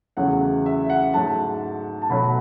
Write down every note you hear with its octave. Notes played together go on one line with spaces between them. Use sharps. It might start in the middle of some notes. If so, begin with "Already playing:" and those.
E2 C#3 F#3 A3 F#5
E5
F#5
G#2 F#3 A3 A5
A5
B2 F#3 A3 B5